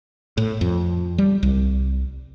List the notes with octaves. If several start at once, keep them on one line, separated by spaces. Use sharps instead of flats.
A2
F2
G3
C2